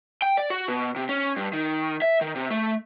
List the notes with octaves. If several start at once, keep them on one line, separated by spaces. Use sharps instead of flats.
G5
D5
F#4
B2
C3
C#4
G2
D#3
E5
D#3
C3
A3